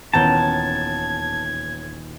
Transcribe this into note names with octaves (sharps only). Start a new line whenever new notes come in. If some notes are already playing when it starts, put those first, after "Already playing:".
D#1 E3 B3 C#4 G5 A5 A#5 G#6